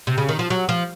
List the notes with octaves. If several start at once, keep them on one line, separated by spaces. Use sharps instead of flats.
C3
C#3
D#3
F3
F#3
F3